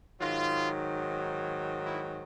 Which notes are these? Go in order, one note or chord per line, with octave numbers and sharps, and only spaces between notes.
G#2 D#3 F#3 F4
E4